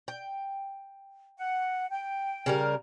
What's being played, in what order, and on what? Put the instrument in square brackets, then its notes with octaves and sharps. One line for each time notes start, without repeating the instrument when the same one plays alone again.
[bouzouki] G5
[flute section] F#5
G5
[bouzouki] C#3 G3 A#4